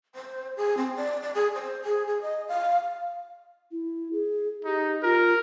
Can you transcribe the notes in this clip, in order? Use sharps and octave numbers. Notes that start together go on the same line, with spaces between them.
C5
G#4
C4
D5
D5
G#4
C5
G#4
G#4
D#5
F5
E4
G#4
D#4 G4
F4 A#4